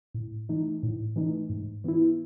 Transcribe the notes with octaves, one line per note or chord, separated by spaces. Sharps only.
A2
E3 A3 D#4
A2
E3 A3 D#4
G#2
E3 B3 E4